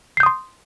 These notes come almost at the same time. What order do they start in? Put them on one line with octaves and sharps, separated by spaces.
C7 G6 D#6 C6